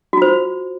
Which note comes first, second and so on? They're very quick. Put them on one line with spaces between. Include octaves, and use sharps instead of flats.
F#4 F4 C5